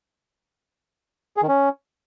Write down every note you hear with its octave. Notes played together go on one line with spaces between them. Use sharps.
G#4
D#3
C#4